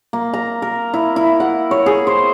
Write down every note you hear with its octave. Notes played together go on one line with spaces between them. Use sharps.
A#3
A#5
A#4
E4
E4
F#5
C#5
G#4
C5